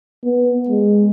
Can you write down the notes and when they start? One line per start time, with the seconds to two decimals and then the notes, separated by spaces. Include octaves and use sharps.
0.24 B3
0.69 G#3